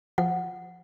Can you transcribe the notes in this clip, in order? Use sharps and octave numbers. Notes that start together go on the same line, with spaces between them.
F3 F#5